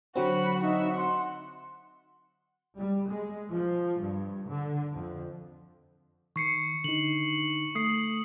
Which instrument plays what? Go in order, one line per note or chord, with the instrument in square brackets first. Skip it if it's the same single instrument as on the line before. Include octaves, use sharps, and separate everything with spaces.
[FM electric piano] D3 F#3 C4 [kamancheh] F#4 B5
[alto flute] D#4 [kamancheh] F#4 E5
[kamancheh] F#5 [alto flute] C6
[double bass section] G3
G#3
F3
G2
D3
F2
[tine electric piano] D#3 [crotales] C#6 C7 C#7
[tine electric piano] D3 D#4 [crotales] F#7
[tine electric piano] A3 [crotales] D#6 C7